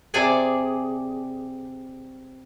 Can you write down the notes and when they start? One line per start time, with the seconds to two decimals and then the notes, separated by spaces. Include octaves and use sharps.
0.14 C3 G#4 D5 G#5